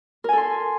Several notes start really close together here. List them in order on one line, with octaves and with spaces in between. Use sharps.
A#4 G#5 A4 C6